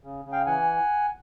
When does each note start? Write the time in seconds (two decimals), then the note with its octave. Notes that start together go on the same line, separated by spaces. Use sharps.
0.04 C#3
0.25 C#3
0.32 F5 G5
0.46 E3 F#5 G#5